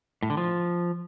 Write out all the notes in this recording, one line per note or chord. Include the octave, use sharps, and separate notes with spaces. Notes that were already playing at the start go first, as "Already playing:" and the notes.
A2
D3
F3